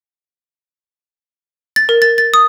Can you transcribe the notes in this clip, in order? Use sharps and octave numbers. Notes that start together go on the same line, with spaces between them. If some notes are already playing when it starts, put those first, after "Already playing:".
A6
A#4
A6
A6
D#6